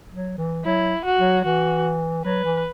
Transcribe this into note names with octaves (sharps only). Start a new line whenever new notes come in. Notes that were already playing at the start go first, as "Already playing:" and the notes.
F#3
E3
F#3 E4
F#4
F#3
E3 F#4
F#3 B4
E3